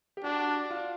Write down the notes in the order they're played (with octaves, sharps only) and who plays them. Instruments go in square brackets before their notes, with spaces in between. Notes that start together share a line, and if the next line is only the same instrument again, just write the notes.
[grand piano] G4
[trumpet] D4 [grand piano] F#4
[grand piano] F4